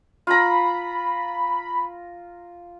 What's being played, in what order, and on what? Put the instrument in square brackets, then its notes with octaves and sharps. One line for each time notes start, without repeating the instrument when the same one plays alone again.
[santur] F4 A#5 [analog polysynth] B5